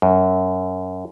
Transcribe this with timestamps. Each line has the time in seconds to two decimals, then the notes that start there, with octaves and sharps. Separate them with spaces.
0.02 F#2